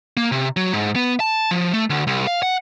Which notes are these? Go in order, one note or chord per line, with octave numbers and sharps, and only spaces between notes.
A#3
C3
F#3
G#2
B3
A5
F3
A3
D2
C2
F5
F#5